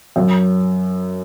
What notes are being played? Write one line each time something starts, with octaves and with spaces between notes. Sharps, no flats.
F#2